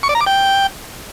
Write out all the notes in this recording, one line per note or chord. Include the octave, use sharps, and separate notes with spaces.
C#6
D5
A#5
D6
G5